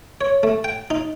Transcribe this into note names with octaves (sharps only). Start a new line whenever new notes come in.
C#5
A3
G5
D#4